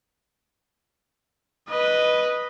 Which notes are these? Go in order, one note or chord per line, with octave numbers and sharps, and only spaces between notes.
B4 D#5